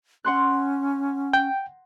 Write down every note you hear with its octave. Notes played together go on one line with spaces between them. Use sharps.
C#4 F#5 C6 F#6
G5